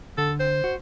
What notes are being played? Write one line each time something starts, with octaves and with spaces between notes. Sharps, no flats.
D3 A4
C5
F#4